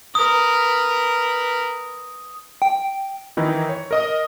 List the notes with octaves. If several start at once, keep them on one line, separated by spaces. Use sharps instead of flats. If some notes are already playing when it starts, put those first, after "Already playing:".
A#4 B4 D#6
G5
D#3 E3 D#4 E4
C#5
A#4 D#5 D#6